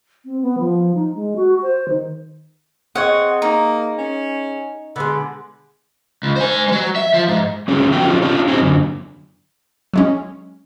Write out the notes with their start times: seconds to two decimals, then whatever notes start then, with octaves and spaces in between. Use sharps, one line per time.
0.25 C4
0.42 B3
0.58 F3
0.95 D#4
1.15 G#3
1.36 F#4
1.62 C5
1.88 D#3
2.95 C4 G#4 C#5 D#5 F#5
3.42 A#3 D#4
3.98 C#4
4.96 D3 G#3 B3
6.23 C#2
6.36 C5 G#5
6.68 F#3 G#3
6.96 E5
7.13 F3
7.28 G#2
7.68 G#3 A3 C#4 F#4 G#4
7.91 F3 B3 F#4 F#5 G5
8.04 C#4 F4 F#4 A4
8.22 C#4 D4 F4 G4 D5
8.48 C4 C#4 D#4 F#4 G#4
8.61 F#2 D3
9.94 F#3 G#3 C#4